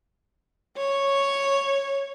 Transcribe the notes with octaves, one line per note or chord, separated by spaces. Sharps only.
C#5